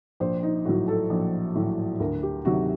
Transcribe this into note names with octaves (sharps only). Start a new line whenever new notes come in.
A#1 C5
D#4
A2 F#3 F#4
A4
A#1
A2 F#3
D2 A#4
G4
C3 D#3 F#3 F#4